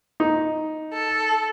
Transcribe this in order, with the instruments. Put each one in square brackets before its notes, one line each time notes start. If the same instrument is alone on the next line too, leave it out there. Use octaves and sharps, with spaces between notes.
[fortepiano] D#4
[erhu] A4